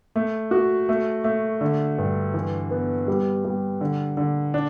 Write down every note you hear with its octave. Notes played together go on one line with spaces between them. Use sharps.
A3
F#4
A3
A3
D3
G2
E3
B3
G3
G3
D3
D3
D4